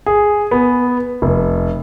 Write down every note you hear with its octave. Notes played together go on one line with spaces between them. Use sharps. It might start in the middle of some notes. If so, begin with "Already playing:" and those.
G#4
B3
F1